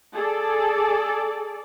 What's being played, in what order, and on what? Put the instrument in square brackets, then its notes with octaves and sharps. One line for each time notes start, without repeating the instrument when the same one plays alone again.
[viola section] G#4 A4 D5